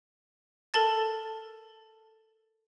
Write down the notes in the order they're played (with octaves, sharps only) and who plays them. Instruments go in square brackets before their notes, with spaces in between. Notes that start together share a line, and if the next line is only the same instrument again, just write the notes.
[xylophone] A4 A#4 A5 A6